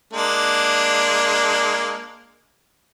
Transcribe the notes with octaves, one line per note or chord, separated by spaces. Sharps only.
G#3 A#3 D4